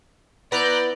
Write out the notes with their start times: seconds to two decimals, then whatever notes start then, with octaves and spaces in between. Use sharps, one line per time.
0.52 B3 E4 B4 D5 A#5 F#6 G6